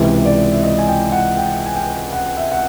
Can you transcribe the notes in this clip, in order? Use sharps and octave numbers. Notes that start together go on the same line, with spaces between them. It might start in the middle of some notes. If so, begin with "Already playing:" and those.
Already playing: C#2 C3 E3 C5
D5
E5
D#5
G#5
G5
F#5
G5
G#5
G5
F#5
E5
F#5